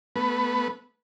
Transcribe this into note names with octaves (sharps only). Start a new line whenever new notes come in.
A3 B3 B4